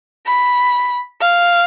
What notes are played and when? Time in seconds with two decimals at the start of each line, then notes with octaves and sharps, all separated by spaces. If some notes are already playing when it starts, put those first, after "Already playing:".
0.26 B5
1.21 F5